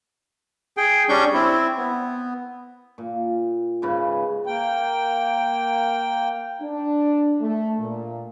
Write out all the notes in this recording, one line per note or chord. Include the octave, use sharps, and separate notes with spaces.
G#4 G5
G3 C#4 D4 C#6 G6
C4 E4
B3
A#2
G#2 C#3 B4
A#3 G5
D4
A3
A#2